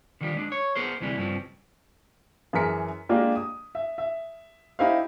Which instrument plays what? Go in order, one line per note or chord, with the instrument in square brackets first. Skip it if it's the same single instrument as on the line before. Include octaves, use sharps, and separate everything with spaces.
[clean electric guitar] D3 D#3 F3 G3
G#3 D4
C#5
B3 G#4 A#4 C5
D2 C3 E3 F3 G3 G#3
G2 C#3 F3 G3 C4
[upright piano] F#2 E3 G#4 A#4 B6 C#7
G#3 A#3 D4 F4 G4 A#4
D#6
E5
E5
D#4 E4 G4 C5 F5